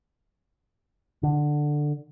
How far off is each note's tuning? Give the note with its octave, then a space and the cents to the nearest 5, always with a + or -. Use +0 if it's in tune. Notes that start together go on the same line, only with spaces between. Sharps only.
D3 +10